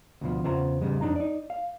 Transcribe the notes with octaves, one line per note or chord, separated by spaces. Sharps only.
D2 B2 F3
E2 C#3 F4 C5 F#5 A#5
E2 G#2 C#3 G3 G#3
F2 D4 D#4 A#5
D#4 D5
F5